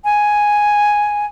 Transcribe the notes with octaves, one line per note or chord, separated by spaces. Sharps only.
G#5